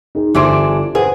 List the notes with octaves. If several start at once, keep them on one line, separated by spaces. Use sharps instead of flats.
D#4 G#4
G1 E3 G3 D4 C5 D7
G#4 B4 C5 F#5